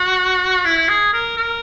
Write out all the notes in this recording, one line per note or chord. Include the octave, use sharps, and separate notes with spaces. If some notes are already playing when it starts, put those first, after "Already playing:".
Already playing: F#4
E4
G#4
A#4
A#4